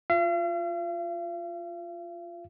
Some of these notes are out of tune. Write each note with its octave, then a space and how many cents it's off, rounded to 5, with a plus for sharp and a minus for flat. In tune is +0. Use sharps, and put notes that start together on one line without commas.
F4 +0 F5 -40